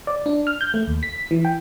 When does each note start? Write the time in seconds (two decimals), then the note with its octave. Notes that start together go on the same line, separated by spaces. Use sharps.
0.07 D5
0.26 D4
0.47 F6
0.61 G6
0.74 A3
0.87 D#2
1.03 B6
1.31 E3
1.45 G5